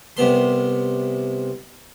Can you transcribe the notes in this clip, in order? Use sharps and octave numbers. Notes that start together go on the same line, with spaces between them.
C2 C3 B3 C6